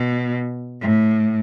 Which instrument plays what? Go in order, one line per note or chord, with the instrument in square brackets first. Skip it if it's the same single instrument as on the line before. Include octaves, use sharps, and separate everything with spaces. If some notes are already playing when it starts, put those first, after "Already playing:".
Already playing: [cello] B2
A2